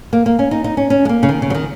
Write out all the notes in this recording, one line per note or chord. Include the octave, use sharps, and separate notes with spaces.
A#3
A#3
C#4
D#4
D#4
C#4
C#4
G#3
A#3
C#3
D#3
C#3
F#3
D#3